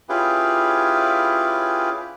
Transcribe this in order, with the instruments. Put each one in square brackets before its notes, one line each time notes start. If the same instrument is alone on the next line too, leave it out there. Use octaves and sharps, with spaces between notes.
[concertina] C#4 E4 F4 G4 G#4 B4